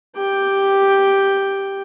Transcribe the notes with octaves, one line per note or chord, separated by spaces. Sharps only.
G4 G5